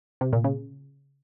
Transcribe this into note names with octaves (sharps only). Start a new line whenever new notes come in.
C3
A#2
C#3